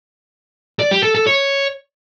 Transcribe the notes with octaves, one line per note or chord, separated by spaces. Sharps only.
D5
G4
A4
A4
C#5